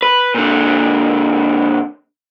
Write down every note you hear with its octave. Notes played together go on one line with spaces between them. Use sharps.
B4
A#2 D3